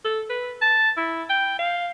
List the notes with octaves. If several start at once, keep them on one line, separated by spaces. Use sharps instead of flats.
A4
B4
A5
E4
G5
F5